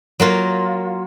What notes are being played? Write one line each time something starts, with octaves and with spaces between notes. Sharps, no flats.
F#3 A#3 F4